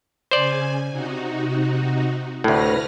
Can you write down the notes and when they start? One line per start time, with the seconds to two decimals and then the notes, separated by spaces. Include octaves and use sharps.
0.31 C#3 C5 D5 G#5
0.90 C3 D#4 F#4
2.44 D2 A2 B4 F6 A#6